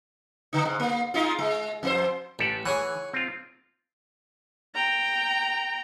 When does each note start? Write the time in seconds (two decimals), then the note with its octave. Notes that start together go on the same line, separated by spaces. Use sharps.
0.53 D3 D#4
0.65 G#2
0.80 A#3
1.14 G#3 D#4 F4
1.39 G#3
1.83 F2 E4 C5
2.39 A1 G4 A4 F#5
2.66 E3 G#4 C#5 F#5
3.13 C4 F4
4.74 G5 A#5